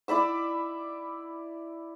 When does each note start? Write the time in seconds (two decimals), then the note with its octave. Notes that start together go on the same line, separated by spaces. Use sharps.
0.08 E4 D5 B5 E6